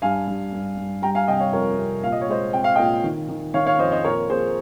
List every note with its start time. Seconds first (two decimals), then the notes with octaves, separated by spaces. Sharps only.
0.02 G2 F5 G#5
0.27 G2
0.53 G2
0.77 G2
1.02 G3 G5 A#5
1.15 F5 G#5
1.27 C3 D#5 G5
1.40 C#5 F5
1.52 F2 A#4 C#5
1.78 C3
2.03 A#2 F5
2.12 D#5
2.21 C#5
2.29 G#3 C5 D#5
2.53 C4 G5
2.64 F5
2.75 A#2 D#5 G5
3.04 D#3
3.29 D#3
3.54 D#3 C#5 F5
3.66 C#5 F5
3.79 F2 C5 D#5
3.92 C5 D#5
4.04 A#2 A#4 C#5
4.29 A#2 G#4 C5